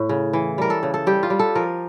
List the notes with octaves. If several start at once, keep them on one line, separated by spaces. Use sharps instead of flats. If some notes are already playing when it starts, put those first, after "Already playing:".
Already playing: A2
C#3
E3
G3 A#4
A4
C#3
A4
G3 G4
F4
G3
A4
F3 A#4